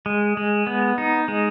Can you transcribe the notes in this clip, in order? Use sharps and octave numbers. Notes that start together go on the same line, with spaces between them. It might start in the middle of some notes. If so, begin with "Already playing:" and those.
G#3
G#3
B3
D#4
G#3